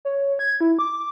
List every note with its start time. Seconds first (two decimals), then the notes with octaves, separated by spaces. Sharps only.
0.05 C#5
0.39 G#6
0.61 E4
0.79 D6